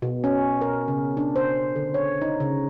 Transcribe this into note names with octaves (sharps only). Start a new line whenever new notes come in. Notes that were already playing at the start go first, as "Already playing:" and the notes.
B2
C#4
A#4
C#3
D4
C5
D3
C#5
D#4
C#3